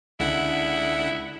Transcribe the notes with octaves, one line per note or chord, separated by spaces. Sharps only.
C#2 D3 E4 F#5